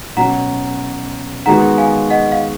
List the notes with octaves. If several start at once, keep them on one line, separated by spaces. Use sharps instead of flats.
B2 F#3 C#4 F#4 F#5 A#5
D#3 G#3 B3 F#4 F#5 A#5
F5 G#5
D#5 F#5
F5